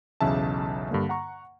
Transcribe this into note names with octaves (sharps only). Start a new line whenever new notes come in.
B1 E2 C#3 E5 A5
G2 D3 A#3
F#5 A#5 C#6